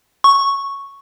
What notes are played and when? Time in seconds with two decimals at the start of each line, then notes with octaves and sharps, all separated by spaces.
0.24 C#6